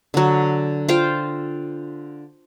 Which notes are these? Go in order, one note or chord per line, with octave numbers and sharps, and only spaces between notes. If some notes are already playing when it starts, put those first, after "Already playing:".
D3 F#3
F4 C5 F5 G5